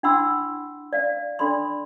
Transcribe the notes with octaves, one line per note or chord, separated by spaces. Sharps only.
D4 E4 F#5 B5 C6 E6
D5 F5
D4 A4 D5 B5 C6